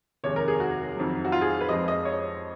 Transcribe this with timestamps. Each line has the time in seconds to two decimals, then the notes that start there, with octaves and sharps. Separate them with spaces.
0.24 F1 D#2 D#3 G#3 C#5
0.36 A#4
0.48 G#4
0.60 F#4
0.96 F2 D#3 F#3
1.25 F#4
1.32 F4
1.41 G#4
1.60 B4
1.69 F2 F3 G#3 D#5
1.88 D#5
2.05 C#5